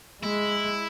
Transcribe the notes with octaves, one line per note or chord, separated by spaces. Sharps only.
G#3 E4